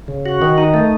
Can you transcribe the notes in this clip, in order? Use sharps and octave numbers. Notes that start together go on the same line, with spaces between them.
C#3
F#4
D#3
D#4
A3